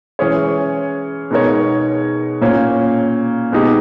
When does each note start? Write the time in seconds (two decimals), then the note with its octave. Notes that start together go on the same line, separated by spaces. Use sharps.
0.19 E3 G#3 C#4 G#4 C#5
1.31 B2 G#3 D#4 A#4 C#5
2.41 A#2 A#3 C#4
3.52 B2 G#3 D#4 G4